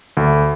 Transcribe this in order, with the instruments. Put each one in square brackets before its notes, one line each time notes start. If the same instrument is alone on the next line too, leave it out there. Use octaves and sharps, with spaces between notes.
[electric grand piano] D2